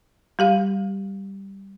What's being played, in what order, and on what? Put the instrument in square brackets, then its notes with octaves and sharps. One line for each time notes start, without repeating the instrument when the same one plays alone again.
[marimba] G3 G4 F5